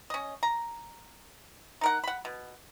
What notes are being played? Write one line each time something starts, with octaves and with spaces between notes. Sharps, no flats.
C#4 D#5
A#5
D#4 A#4 F#5
F#5 B5
B2